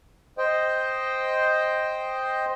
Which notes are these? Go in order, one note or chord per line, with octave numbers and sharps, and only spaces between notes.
C5 D#5 G5